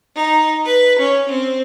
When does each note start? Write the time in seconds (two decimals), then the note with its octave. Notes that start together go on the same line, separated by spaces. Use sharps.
0.16 D#4
0.66 B4
0.99 C#4
1.29 C4